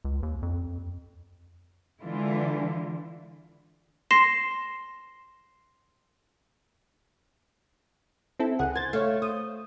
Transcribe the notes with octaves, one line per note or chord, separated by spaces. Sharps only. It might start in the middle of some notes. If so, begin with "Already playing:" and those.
C#2
D#2
F2
D3 E3 G#3 E4 F4
C6 A#6 C7 E7
C4 E4 A4
C#2 G#4 F#5
C5 G#6 A6
A3 C#5 F5
C5 D#6